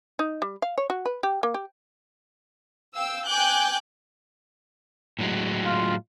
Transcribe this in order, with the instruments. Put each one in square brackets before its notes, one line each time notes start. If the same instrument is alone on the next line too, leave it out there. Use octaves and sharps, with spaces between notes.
[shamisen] D#4
G3
F5
C#5
F#4
B4
G4
A#3
G4
[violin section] F5 G5 E6
G5 G#5 D6 F#6 G6
[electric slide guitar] A2 F#3 G#3
[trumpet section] F4